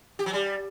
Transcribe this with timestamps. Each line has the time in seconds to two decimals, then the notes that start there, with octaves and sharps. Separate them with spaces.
0.19 G4
0.26 F#3
0.33 G3